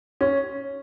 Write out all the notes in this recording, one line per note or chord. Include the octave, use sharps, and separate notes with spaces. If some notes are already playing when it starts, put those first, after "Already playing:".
C#4